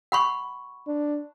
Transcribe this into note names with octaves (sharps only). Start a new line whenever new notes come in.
F#5 B5 C#6
D4